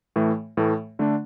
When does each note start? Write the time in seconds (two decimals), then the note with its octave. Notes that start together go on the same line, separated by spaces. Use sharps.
0.16 A2 E3 A3
0.57 A2 E3 A3
0.99 D3 A3 D4